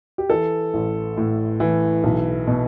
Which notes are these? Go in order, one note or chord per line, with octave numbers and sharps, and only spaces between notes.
G4
E3 A4
A1
A2
E3
B1
B2